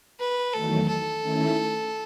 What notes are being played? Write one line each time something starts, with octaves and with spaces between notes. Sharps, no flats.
B4
E2 D#3 F#3 A3 A4
A4
D#3 A3 C#4 E4